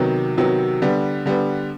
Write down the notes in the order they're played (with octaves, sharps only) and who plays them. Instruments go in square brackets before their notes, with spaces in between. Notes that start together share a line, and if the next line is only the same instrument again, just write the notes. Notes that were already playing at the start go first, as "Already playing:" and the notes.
Already playing: [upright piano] C3 D#3 F#3 B3
C3 D#3 F#3 B3
D3 G3 B3
D3 G3 B3